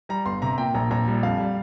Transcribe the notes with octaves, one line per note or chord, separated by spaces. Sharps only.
G3 A#5
G1 C6
C3 A#5
A#2 G5
A#1 A#5
A#1 A#5
G3
F2 F5
G3